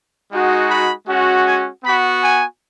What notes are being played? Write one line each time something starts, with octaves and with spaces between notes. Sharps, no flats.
G#3 D#4 F#4
B5
G#3 C#4 F#4
G#5
B3 F#4 B5
G#5